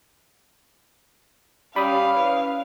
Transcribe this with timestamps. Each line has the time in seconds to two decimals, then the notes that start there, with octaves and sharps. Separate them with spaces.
1.76 G3 C#4 F5 B5 D#6
2.16 E3